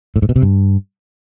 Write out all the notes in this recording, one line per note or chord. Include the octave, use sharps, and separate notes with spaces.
A2
G#2
B2
C3
G2